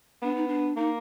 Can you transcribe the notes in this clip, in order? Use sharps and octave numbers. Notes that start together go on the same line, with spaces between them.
B3 D4
D#4
D4
A#3 D#4